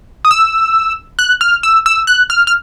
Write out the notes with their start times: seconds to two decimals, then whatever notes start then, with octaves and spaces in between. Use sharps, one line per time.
0.25 D#6
0.31 E6
1.19 F#6
1.41 F6
1.63 E6
1.86 E6
2.07 F#6
2.30 F6
2.47 F6